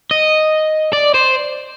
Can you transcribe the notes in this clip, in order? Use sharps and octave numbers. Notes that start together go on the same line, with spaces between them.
D#5
D5
C5